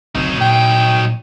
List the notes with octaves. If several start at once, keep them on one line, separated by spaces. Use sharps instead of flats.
F#1 D2 F#3 C4 D#4
A#2 G5